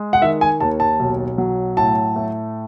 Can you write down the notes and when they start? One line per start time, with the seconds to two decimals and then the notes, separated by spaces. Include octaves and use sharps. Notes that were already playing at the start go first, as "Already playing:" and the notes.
Already playing: G#3
0.13 F#5
0.21 D#3 E5
0.41 G#5
0.60 D#2 A5
0.80 A5
0.99 B1
1.38 F#3
1.77 A2 A5
2.16 A3